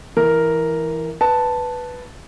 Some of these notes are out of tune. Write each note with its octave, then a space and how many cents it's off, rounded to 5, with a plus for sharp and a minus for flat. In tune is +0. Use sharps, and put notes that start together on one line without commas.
E3 +0 A#4 +0
B4 +0 A5 +0